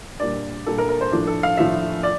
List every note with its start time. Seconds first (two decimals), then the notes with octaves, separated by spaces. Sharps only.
0.20 A#2 G3 A#3 D4 D5
0.66 A#2 G3 A#3 D4 A4
0.78 A#4
0.89 A#4
1.01 C5
1.12 A2 F3 A3 D4
1.27 A4
1.43 F5
1.57 A2 F3 A3 D4 E5
2.03 D5